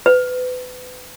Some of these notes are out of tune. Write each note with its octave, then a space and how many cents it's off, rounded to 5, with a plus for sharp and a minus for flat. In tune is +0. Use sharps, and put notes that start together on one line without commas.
B4 +30